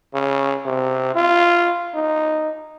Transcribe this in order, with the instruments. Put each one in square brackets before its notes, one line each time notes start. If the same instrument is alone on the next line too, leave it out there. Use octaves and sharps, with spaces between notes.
[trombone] C#3
C3
F4
D#4